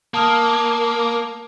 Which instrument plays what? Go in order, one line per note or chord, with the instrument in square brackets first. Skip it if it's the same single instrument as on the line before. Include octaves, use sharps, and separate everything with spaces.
[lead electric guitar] A#3 [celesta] A5 D#6 F6